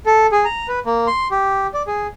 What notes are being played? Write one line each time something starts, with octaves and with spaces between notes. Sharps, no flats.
A4
G#4
A#5
B4
A#3
C6
G4
D5
G#4